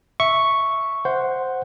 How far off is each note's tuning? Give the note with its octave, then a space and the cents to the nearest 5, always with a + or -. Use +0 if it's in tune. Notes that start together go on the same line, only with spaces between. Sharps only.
E5 +0 C#6 +0
C5 +0 F#5 +0